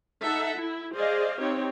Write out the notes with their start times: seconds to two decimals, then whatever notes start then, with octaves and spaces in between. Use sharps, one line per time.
0.22 D#4 A4 E5 F#5
0.56 E4
0.94 G#4 C5 D5 D#5 F5
1.39 C4 D#4 G4 C#5